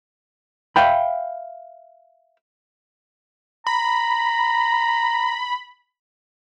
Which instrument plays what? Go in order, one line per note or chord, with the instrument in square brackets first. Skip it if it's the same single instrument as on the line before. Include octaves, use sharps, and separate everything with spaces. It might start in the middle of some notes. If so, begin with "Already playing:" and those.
[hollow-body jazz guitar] E5 F5 G5 B5
[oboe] A#5 [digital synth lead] B5